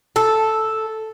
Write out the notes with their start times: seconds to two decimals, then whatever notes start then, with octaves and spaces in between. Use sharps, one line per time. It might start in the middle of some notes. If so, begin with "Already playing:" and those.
0.16 A4